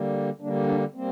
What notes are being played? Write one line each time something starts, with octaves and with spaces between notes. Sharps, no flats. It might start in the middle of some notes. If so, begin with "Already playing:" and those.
Already playing: D3 G3 A#3
D3 G3 A#3 D4
D4
G3 A#3 C4